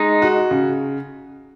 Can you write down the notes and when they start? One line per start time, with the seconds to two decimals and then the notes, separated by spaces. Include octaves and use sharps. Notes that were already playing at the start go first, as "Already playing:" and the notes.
Already playing: G#3 D#4
0.22 F#4
0.51 C#3